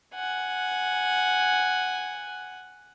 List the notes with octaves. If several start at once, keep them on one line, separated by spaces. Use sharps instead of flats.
F#5 G#5